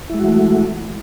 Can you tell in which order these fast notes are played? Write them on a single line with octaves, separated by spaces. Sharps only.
E4 G#3 F#4 E3 A3